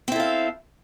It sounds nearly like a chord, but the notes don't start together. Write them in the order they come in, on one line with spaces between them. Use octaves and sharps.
C4 E4 A4 F5